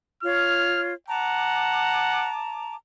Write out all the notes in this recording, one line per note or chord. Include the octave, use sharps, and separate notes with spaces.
F4 C#5 F6
F#5 A5 A#5 D6